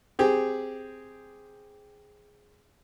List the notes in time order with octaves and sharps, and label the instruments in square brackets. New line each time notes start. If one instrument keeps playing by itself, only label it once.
[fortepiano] C4 G4 G#4